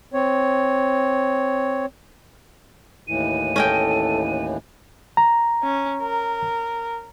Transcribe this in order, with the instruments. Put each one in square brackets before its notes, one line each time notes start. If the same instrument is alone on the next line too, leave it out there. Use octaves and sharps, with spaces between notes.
[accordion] C4 C#5
[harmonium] D#2 A2 E3 [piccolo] D#7
[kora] C#4 D#5 G5 [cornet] A4
[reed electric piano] A#5
[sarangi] C#4
A#4